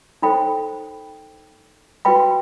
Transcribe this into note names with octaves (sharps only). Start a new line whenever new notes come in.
D#4 A4 C5 G5 B5
F#4 B4 G5 B5